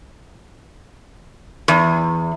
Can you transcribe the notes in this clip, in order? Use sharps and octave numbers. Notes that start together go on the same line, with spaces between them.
E2